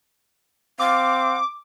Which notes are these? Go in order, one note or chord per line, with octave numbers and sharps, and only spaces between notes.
C4 F5 D6